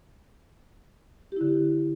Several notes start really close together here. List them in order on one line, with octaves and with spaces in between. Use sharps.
G4 E4 D3